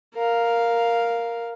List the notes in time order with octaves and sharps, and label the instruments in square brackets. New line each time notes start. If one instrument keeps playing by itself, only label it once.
[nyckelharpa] A#4 F5